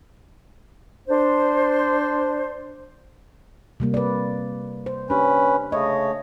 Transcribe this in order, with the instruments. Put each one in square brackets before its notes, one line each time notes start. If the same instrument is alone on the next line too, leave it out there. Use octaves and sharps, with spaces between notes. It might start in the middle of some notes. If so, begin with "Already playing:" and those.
[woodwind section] D4 C5
[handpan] C3 G3 A#3
B4 D5
C5
[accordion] C#4 B4 [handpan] D4 G4
[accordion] C#3 A3 C#5 [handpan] D#5